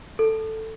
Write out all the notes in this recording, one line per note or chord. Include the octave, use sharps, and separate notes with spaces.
A4